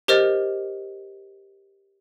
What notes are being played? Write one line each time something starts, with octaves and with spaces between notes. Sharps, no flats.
G4 A#4 C5 D#5 F6 A6